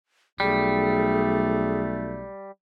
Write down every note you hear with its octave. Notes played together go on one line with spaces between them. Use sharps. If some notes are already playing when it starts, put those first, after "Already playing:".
B1 G3 A3 G#4